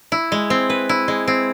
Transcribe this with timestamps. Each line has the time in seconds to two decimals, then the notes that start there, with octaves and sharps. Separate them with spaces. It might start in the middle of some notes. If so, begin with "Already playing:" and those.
0.12 E4
0.32 G#3
0.50 C4
0.70 B4
0.89 E4
1.08 G#3
1.28 C4